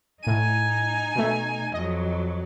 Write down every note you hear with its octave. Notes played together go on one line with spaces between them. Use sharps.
A2 D#4 G#5 D#7
B2 A3
F2 F#3 D#5